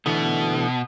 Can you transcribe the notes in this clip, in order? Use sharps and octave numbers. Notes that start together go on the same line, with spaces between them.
B2 D3 E3 A3